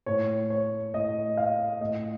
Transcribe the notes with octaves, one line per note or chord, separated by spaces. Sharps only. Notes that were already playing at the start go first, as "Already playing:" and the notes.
A2 C#5
C#5
A2 D#5
F5
A2 D#5